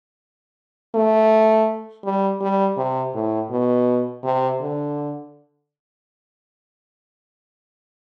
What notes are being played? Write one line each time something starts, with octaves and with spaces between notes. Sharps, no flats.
A3
G3
G3
C3
A2
B2
C3
D3